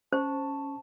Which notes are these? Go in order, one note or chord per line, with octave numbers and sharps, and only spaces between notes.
C#4 C5 A5 C#6